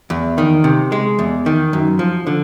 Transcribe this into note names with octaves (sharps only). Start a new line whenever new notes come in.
E2
D#3
C3
G#3
E2
D#3
F#2
F3
D3